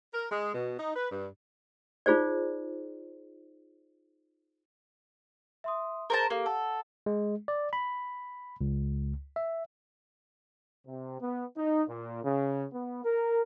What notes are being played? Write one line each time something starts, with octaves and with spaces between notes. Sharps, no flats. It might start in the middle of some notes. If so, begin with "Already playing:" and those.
A#4
G#3
B2
D#4
B4
G2
D#4 F4 G#4 C5 D5
E5 C6 D#6
G#4 A#4 C5 A5
A#3 G4 A4 F5
A4 F#5
G#3
D5
B5
C#2
E5
C3
B3
D#4
A#2
C#3
B3
A#4